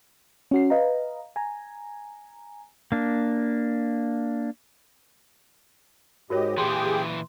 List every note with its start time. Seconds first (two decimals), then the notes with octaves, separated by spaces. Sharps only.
0.51 C#4 F#4 C7
0.70 B4 D#5 F5 A#5
1.36 G#5 A#5
2.92 A#3 D4
6.30 G#2 F#4 G4 A#4 C#5 D#5
6.58 A#2 E3 G4 G#4 G5 C6